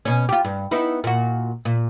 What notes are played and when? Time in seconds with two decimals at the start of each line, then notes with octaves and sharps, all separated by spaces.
0.05 B2 C#4
0.29 F4 G4
0.44 G2
0.71 B3 D#4 E4
1.04 A#2 F#4
1.65 A#2